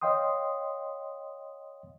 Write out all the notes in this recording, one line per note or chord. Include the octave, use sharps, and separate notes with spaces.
C#5 D#5 F5 G5 C6 D#6